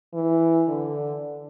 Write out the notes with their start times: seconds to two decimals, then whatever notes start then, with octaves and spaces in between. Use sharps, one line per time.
0.14 E3
0.68 D3